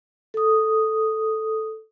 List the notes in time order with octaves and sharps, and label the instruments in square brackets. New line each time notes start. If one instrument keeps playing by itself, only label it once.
[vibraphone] A4 D#6